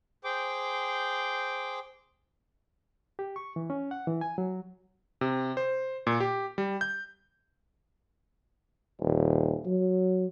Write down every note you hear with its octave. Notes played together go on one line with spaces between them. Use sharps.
G#4 C5 G5 D6
G4
C#6
E3
C#4
F#5
E3
G#5
F#3
C3
C5
A#2
G4
G3
G6
D#1
F#3